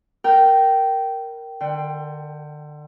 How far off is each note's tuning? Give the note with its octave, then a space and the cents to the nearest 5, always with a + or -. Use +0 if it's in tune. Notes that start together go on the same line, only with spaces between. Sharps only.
A#4 +0 G5 -15
D3 +30 G5 +10